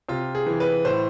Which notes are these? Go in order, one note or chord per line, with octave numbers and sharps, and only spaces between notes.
C3 F4
G#4
E3
B4
A2 C5